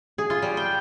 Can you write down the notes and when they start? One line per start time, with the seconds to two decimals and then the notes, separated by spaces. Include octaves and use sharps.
0.18 G#4
0.30 F4
0.42 G3
0.57 G5